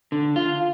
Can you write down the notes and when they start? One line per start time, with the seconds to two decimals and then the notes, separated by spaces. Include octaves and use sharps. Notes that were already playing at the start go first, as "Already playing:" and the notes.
0.12 D3
0.36 F4